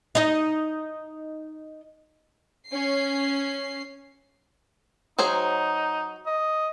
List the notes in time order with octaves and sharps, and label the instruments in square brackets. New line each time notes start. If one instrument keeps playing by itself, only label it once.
[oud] D#4 D#5
[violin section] C#4 C7
[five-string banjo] F#3 G#4 C5 [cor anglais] D#4
[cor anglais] D#5